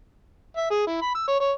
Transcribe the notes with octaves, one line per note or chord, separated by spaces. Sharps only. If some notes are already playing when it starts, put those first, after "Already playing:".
E5
G#4
E4
B5
E6
C#5
C#5